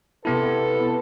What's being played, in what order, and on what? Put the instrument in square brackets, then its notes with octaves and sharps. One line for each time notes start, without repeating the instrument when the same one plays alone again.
[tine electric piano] C3 B3 E4 [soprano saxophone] A4 [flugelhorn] B4